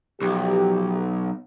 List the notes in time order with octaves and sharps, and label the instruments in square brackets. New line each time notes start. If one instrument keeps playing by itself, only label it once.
[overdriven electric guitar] B1 [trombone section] F3 G4